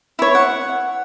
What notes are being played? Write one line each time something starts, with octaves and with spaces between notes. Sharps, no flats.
E4 C#5
F#5